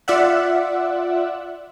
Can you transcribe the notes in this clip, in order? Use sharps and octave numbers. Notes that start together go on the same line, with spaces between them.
F4 D5 E5 F#5